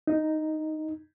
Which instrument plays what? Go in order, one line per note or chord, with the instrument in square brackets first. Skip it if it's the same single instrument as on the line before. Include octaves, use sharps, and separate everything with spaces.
[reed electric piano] D#4